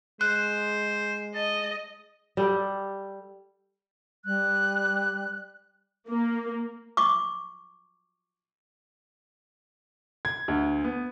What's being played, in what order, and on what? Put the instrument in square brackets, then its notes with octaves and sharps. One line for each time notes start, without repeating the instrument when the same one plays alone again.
[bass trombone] G#3 [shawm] C5 [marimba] F#6
[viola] D#5 [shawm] A5
[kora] G3 A4
[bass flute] G3 [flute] F#6
[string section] A#3
[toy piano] C#6 D6
[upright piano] G#6
D2
B3